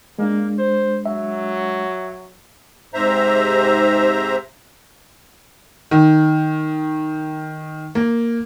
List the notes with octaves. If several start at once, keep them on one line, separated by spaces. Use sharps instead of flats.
G#3 A#3 D4
C5
F#3 E5
G#2 C3 C5 E5 A#5
D#3
A#3